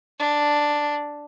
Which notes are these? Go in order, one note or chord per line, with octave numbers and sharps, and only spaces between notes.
D4